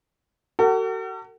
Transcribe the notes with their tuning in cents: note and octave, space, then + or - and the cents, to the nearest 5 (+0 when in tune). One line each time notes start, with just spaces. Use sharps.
F#4 +40 A4 +45 F#5 +30